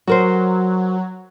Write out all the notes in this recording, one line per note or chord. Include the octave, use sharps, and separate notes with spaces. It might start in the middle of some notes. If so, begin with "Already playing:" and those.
F#3 F#4 A#4 C5